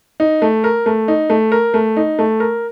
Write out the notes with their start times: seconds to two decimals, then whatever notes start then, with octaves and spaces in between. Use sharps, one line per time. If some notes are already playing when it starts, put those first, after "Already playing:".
0.20 D#4
0.42 A3
0.64 A#4
0.86 A3
1.08 D#4
1.30 A3
1.52 A#4
1.74 A3
1.97 D#4
2.19 A3
2.40 A#4